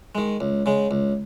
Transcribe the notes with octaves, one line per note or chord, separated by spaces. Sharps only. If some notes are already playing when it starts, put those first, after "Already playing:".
D#3 G#3
C#2
C#3 G#3
C#2